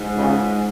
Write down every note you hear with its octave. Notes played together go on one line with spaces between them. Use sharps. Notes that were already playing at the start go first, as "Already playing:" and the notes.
Already playing: G#2
C#2 C#3